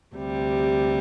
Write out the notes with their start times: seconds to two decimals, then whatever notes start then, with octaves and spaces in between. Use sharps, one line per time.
0.15 D2 C3 G3